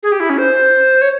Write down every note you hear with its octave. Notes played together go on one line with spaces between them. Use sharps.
G#4
G4
E4
C#4
C5
C#5